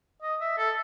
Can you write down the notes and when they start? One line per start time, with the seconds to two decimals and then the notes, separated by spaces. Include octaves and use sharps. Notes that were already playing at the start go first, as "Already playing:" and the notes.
0.22 D#5
0.41 E5
0.58 A4